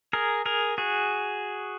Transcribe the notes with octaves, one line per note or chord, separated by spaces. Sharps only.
G#4 A#4
G#4 A#4
F#4 G#4